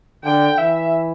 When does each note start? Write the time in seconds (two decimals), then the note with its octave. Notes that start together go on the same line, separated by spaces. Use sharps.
0.24 D3 G5
0.57 E3 E5